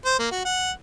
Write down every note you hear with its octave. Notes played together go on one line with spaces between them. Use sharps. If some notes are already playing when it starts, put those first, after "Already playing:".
C5
A#3
F#4
F#5